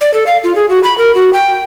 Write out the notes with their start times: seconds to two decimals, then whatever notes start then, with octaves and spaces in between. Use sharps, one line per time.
0.01 D5
0.14 A4
0.26 F5
0.44 F4
0.56 G#4
0.69 F#4
0.83 B5
0.98 A#4
1.15 F#4
1.33 G5